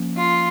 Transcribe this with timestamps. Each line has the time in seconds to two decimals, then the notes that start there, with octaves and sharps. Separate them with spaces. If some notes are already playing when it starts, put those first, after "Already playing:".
Already playing: F3 A#3 C#4
0.17 F4